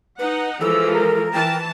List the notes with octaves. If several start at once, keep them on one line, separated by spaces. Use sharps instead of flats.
D#4 B4 F#5
E3 F3 G#3 A4 E6
A#4
E3 G5 A5